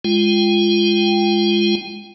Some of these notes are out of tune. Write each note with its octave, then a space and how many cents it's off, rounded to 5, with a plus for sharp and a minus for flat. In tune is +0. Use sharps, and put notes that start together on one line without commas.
G#3 -5 F4 -15 G5 +0